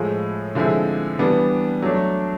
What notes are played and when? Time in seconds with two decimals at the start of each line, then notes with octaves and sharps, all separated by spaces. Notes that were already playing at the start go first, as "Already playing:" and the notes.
Already playing: A2 F3 G#3
0.55 D3 F3 G#3 C4 E4
1.19 E3 G3 B3 D4
1.82 F#3 A3 D4